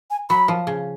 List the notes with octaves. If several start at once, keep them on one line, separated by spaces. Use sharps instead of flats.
G#5
F#3 B5
F3
C#3